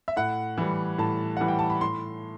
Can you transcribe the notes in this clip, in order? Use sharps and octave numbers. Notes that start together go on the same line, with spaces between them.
E5
A2 F#5
E3 G3
A2 A5
E3 G3 F#5
G5
A5
B5
A2 C6